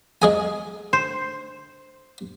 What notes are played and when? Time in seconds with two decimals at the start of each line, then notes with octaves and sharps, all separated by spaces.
0.22 G#3 G#4 G#5
0.93 C5